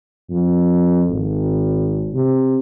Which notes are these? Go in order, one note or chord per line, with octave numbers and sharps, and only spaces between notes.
F2
G#1
C3